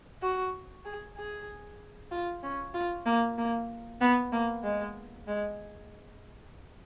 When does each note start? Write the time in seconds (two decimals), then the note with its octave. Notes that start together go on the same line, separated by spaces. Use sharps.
0.22 F#4
0.85 G#4
1.17 G#4
2.11 F4
2.43 C#4
2.74 F4
3.06 A#3
3.38 A#3
4.01 B3
4.32 A#3
4.64 G#3
5.28 G#3